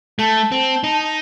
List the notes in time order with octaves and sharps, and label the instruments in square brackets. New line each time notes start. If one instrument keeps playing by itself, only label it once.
[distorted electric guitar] A3 [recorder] A5
[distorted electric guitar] C4
D#4